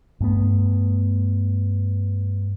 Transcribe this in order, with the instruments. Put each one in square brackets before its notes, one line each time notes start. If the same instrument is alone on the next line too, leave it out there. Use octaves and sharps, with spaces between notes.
[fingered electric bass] G2 A3 B3